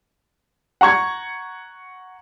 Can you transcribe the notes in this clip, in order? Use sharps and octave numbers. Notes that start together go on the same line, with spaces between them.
F#5 A#5 C#6 G#6